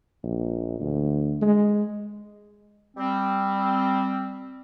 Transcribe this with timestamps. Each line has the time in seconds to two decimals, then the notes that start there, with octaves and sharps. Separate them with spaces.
0.24 A#1
0.80 D2
1.42 G#3
2.97 G3 C4